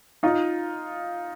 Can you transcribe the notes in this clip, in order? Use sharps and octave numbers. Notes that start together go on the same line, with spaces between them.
D#4 F4